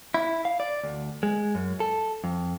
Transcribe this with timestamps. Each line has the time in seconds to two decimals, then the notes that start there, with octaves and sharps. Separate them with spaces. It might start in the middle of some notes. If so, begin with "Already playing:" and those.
0.14 E4
0.45 F5
0.60 D5
0.84 D2
1.23 G#3
1.55 F#2
1.80 A4
2.24 F2